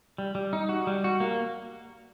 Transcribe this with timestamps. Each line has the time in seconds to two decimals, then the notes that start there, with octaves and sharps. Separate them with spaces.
0.18 G3
0.35 G3
0.53 D#4
0.69 F#4
0.87 G3
1.04 F#4
1.20 A#3